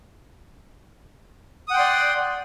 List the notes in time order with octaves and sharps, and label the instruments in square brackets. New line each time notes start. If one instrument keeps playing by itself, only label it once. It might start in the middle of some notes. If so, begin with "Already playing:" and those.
[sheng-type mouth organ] D#6
F#5
G5
C6
D5